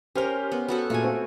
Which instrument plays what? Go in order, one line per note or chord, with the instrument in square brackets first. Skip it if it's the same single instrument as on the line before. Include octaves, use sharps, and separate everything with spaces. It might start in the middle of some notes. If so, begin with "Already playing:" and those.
[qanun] C#4 A#4 [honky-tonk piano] G4 C5 F6
[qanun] B3
B3 F#4 A4
[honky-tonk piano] A#2 [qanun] A3 G#4 G#5
[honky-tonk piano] C4 F#4